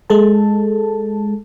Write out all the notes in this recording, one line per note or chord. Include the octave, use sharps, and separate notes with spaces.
G#3 A4 A5